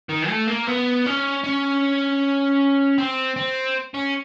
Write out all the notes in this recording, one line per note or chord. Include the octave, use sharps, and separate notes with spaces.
D#3
A3
A#3
B3
C#4
C#4
C4
C4
C#4